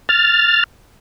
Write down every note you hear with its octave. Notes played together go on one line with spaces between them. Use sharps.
F6 A6